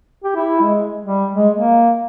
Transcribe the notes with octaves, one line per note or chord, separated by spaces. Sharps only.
G4
E4
G#3
G3
G#3
A#3